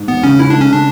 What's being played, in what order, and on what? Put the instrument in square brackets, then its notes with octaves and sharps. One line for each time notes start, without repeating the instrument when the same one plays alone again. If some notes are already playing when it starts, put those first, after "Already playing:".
Already playing: [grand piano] G#2
[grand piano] E1 [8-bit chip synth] B3
[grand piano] C#3 [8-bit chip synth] C#4
[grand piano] G#2 [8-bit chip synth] E4
[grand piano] A3 [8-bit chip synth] D4
[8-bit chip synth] C#4
[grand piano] C#3 [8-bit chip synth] D4